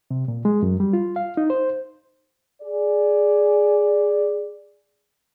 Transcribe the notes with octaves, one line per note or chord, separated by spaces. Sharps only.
C3
A#2
G#3
F#2
G3
F4
F5
D#4
C5
G#4 D5